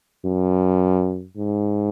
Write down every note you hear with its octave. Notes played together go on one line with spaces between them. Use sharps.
F#2
G#2